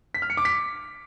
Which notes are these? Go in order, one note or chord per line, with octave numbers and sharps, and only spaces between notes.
B6
F6
C#7
D6
B6